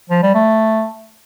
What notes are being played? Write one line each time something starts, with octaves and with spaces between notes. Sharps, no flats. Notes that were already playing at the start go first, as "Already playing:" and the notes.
F3
G3
A3